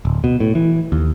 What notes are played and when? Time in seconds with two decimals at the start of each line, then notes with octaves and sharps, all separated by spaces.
0.05 D1
0.24 B2
0.40 A2
0.55 E3
0.92 D#2